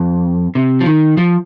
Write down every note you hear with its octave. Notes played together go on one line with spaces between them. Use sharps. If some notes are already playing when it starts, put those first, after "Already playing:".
Already playing: F2
C3
F3
D#3
F3